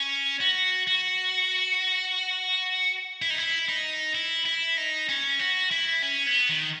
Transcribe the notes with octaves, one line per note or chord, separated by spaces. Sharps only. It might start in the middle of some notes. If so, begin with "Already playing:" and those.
Already playing: C#4
F#4
F#4
E4
D#4
E4
D#4
E4
E4
D#4
C#4
F#4
E4
C#4
B3
D#3